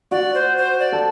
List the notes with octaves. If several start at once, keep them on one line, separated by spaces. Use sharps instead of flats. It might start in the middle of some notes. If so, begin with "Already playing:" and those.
F#4 D5
C5
C5
D5
A4